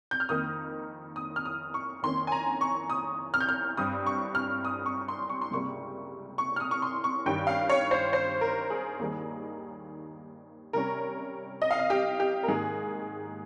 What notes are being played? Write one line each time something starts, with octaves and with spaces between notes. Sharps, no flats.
G6
F6
F2 D#3 A#3 D#4 D#6
D#6
F6
D#6
C#6
F2 D#3 A#3 C#4 C6
G#5
A#5
C#6
D#6
F6
G6
F6
G2 G3 C4 D#6
C#6
F6
D#6
C#6
C6
C#6
C6
C#2 C3 G3 A#3 C#6
C#6
F6
D#6
C#6
C6
C#6
G2 D#3 G3 C#4 G5
F5
C#5
C5
C5
A#4
G#4
D#2 D#3 G3 A#3 D#4
C3 G3 C#4 A#4
D#5
F5
D#5
G4
G4
A#4
G#2 D#3 A#3 D#4 G#4